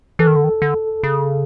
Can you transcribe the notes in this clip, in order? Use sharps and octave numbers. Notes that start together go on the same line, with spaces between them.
E3 A4
D#3
D3
D#3
D3
C#3